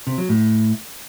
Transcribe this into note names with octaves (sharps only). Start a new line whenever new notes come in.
C3
F#3
A2